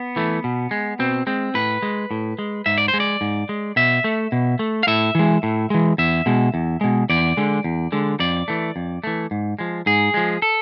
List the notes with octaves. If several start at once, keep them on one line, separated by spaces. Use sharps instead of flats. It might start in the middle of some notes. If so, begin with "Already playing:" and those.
Already playing: B3
E3 A3
B2
G#3
B2 C4
G#3 C4
A2 B4
G#3
A2
G#3
G#2 E5
D5
C5
G#3
D5
G#2
G#3
B2 E5
A3
B2
A3
F5
A2 E5
E3 G#3
A2
E3 G#3
E2 E5
B2 G#3
E2
B2 G#3
E2 D5
D3 G#3
E2
D3 G#3
F2 D5
E3 A3
F2
E3 A3
G#2
F3 G#3
G#2 G#4
F3 G#3
A4